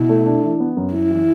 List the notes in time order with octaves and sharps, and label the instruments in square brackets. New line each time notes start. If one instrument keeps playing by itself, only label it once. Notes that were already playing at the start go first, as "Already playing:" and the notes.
Already playing: [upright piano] B2 [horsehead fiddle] E4
[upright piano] A3
D4
E3
B3
F#2
[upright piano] F#2 [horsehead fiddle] E4
[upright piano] E3